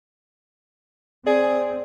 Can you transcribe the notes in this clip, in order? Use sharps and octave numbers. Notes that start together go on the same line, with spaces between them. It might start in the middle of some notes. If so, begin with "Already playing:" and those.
C4 G#4 D5